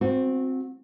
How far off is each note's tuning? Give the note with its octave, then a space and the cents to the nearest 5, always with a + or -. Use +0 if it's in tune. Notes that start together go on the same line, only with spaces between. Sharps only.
C4 +0 F#4 -30